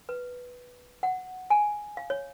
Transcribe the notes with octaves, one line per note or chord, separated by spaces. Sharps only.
B4
F#5
G#5
F5
C#5